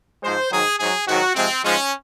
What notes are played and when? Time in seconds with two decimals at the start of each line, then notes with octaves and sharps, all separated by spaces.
0.23 G#2 F3 G#3 C5
0.51 G#2 D#3 F#3 G#4
0.79 G#2 F#3 G#4
1.07 G#2 D#3 F#3 F#4
1.35 C3 F3 G#3 C4
1.63 G#2 F3 G#3 C#4